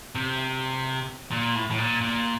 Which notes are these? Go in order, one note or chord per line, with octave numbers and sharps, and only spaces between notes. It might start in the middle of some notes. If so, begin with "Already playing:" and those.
C3
A#2
A2
A2
A#2
A#2